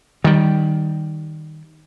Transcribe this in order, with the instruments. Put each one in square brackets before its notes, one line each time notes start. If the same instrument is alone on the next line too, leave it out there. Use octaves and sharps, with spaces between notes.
[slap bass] D#3 G3